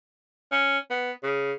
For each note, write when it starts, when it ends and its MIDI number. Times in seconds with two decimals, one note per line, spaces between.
0.52 0.78 61
0.91 1.12 59
1.23 1.53 49